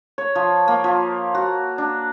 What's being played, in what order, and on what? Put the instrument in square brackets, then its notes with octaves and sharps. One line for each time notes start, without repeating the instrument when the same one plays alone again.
[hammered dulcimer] C#5
F3
A#3
F3
F#4
D4